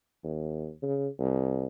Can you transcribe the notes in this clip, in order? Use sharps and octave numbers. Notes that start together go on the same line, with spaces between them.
D#2
C#3
C2